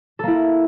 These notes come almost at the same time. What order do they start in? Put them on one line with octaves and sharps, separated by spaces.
A4 A#3 E4